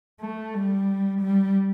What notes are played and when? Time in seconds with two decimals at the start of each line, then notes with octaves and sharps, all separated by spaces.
0.21 A3
0.54 G3
1.21 G3